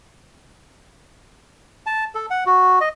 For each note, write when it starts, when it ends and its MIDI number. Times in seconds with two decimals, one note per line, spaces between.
1.86 2.04 81
2.15 2.26 69
2.30 2.44 78
2.46 2.79 66
2.81 2.89 75